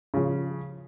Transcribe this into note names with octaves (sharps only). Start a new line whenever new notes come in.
C#3 F3